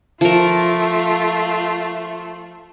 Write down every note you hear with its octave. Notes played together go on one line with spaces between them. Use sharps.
F3 A3 F4 A#4